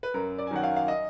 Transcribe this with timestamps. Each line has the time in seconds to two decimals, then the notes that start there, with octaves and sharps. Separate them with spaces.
0.03 B4
0.14 F#2 A#4
0.38 D5
0.47 G#5
0.51 D#3 F#3 F#5
0.63 F5
0.76 F5
0.88 D#5